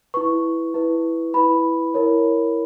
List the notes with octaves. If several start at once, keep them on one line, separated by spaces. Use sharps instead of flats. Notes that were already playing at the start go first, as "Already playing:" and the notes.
E4 B4 C#6
E4 B4
E4 B4 B5
E4 A#4 C#5